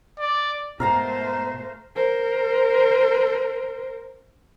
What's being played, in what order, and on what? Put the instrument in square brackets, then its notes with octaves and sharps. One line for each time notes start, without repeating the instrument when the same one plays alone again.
[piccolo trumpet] D5
[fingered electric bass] G#2 B2 [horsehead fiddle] A3 C5 [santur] A#4 F5 A#5
[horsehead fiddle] A#4 C5